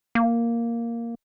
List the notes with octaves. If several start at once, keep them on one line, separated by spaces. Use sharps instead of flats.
A#3